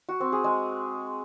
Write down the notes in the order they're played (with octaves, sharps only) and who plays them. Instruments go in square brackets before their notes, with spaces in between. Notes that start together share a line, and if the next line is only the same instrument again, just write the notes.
[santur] F#4
C4
G#4
G#3